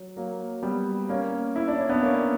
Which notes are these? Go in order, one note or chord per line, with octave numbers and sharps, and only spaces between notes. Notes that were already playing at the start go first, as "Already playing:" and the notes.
Already playing: F#3
F#3 A#3
G3 B3
A#3 C#4
E4
D4
C#4
B3 D4
A#3 C#4